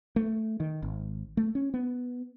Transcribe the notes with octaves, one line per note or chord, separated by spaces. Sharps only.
A3
D#3
G#1
A3
C#4
B3